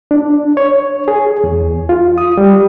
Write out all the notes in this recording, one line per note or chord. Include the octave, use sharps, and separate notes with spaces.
D4
C#5
G#4
E2
F4
D#6
G3